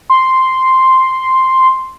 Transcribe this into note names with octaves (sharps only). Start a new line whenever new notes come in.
C6